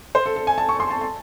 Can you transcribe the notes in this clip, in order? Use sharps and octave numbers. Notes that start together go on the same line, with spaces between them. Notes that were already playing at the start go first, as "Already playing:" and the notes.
C5
A4
A4
G#5
A5
C#6
C6
A5
A5